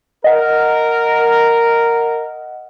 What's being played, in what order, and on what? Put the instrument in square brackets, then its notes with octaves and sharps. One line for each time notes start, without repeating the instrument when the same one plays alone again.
[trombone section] A#4 [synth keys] D#5 F#5